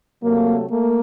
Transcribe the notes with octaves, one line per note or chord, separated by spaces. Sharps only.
C3 F#3 A3 A#3
A3 A#3